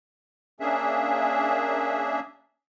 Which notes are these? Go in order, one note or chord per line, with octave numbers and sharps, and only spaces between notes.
A#3 C#4 D4 G#4 E5